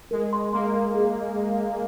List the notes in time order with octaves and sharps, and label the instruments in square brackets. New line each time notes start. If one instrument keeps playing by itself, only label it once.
[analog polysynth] G#3 [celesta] A#4
[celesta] C6
[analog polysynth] A#3 [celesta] C6
[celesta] A#4
G#4